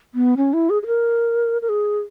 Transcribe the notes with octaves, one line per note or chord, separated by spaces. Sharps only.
B3
C#4
E4
G#4
G#4
A#4
A#4
G#4